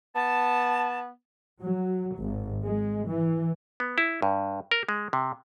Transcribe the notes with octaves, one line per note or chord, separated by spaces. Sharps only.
B3 A5
F#3
G#1
G#3
E3
B3
E4
G2
A#4
G#3
C3